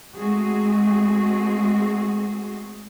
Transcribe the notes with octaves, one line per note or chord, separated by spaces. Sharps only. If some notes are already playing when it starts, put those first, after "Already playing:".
G#3 A3 C4 F#4 G#4